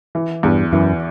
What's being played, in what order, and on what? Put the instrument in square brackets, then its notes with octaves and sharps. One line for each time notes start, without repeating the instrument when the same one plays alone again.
[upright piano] E3
[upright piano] E2 [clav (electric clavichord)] G2
[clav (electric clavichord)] F#2 [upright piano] E3